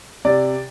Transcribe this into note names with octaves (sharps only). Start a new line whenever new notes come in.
C3 D5